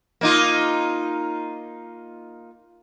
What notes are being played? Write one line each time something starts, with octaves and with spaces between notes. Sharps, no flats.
A#3 D#4 F4